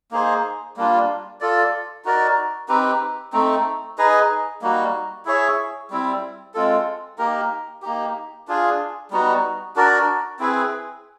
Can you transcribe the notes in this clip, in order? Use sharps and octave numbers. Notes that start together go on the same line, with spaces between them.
A#3 D#4 G#4 C5
G3 A#3 D4 F4
F4 A4 D5
D#4 F#4 A#4 D5
C4 D#4 G4 B4
A3 C4 D#4
D#4 G#4 B4 D#5
G3 A#3 D#4 F#4
E4 G#4 C#5 E5
G3 C4 E4
G#3 C4 F4 A4
A#3 D#4 G4 A#4
A#3 D#4 G4
D4 F4 G#4
G3 B3 D#4 F#4
D4 F#4 A#4 D5
C4 E4 G#4 B4